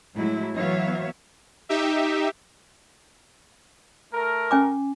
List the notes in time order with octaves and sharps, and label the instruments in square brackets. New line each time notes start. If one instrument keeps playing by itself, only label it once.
[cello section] A2 F#3 G#3 E4
E3 F#3 B3 C#5 E5 F5
[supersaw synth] D#4 G4 E5
[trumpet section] A3 A#4
[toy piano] C#4 G#5 D6